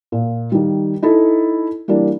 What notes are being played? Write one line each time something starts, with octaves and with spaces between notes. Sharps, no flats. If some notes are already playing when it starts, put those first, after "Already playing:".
A#2
D#3 G3
D#4 E4 A4
E3 G3 A#3 D4